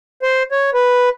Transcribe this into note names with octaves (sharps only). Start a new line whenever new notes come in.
C5
C#5
B4